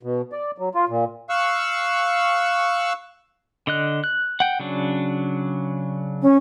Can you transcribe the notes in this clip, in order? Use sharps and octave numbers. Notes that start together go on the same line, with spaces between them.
B2
D5
F#3
F4
A#2
F5 C#6 E6 F#6
D3 D#5 F#6
F#6
F#5 G5
C#3 F#3 D4
C#4